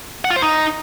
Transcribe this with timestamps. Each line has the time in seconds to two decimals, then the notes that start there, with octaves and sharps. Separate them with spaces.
0.25 F#5
0.30 F4
0.36 C5
0.42 D#4